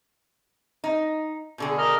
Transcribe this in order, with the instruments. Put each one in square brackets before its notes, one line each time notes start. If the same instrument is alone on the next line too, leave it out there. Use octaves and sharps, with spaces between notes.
[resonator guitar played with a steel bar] D#4
B2 D3 G#4
[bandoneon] A#4 D#5 F6